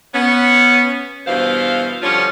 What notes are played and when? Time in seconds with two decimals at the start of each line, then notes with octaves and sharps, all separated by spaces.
0.14 B3 C#4
1.27 G2 B2 E3 F4 C5 F5
2.02 D3 F3 G3 C#4 F4 C#5